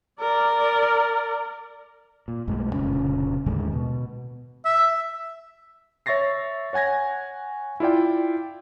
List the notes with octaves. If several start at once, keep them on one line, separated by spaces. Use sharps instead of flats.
A#4 D5
A#2
B1 F#2 G#3 A3
F1 A#2 C#3 C#4
D#2 A2 D3 G#3
B2
E5
C#5 E5 C#6 A6 A#6 C7
C#5 F#5 G#5 G#6 A#6
E4 F4 D5 G5